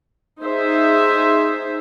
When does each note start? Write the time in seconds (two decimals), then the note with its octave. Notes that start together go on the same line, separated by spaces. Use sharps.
0.41 D#4 G#4 C5 E5